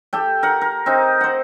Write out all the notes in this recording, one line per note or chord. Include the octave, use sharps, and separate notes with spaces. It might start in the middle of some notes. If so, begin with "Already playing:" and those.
G4 A4 G5
A#4 F#5
A#4
C4 D#4
C5 F#5